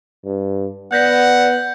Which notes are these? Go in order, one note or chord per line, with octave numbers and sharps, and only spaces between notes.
G2
B3 D5 F#5 G6 A#6 B6